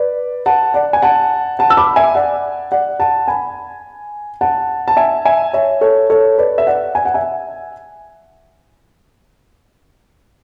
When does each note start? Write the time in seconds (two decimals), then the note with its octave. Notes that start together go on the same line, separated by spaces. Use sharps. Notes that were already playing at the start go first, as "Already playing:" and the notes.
Already playing: B4 D5
0.46 F#5 A5
0.74 D5 F#5
0.93 G#5
1.02 F#5 A5
1.59 F#5 A5
1.70 E6
1.77 B5 D6
1.96 E5 G#5
2.15 D5 F#5
2.72 D5 F#5
2.99 F#5 A5
3.28 G#5 B5
4.41 F#5 A5
4.88 A5
4.97 E5 G#5
5.25 E5 G#5
5.53 C#5 E5
5.81 A4 C#5
6.10 A4 C#5
6.38 B4 D5
6.58 E5
6.67 D5 F#5
6.95 G#5
7.05 F#5
7.14 E5 G#5